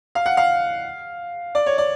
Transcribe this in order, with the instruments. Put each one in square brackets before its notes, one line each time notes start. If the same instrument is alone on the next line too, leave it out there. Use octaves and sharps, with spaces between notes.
[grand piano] F5
F#5
F5
D5
C#5
D5